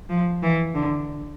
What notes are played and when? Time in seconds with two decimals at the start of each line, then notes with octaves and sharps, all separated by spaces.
0.09 F3
0.43 E3
0.75 D3